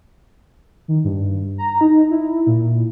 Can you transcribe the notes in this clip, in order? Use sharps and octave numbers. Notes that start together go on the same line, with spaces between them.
D#3
G2
A#5
D#4
E4
A#2